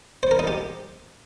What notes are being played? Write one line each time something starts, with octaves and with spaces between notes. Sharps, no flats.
C5
A#4
D#4
G4